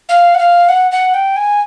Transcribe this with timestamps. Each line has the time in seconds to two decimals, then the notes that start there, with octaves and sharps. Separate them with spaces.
0.09 F5
0.34 F#5
0.39 F5
0.69 F#5
0.91 F#5
1.14 G5
1.36 G#5